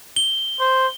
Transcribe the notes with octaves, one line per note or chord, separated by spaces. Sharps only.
G7
C5